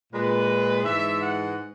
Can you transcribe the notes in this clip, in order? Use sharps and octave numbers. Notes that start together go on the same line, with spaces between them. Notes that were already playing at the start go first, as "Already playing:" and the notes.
A#2 G#3 B4
G#2 E3 G#3 E5
F#5